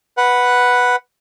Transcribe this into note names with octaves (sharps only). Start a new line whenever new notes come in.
B4 F#5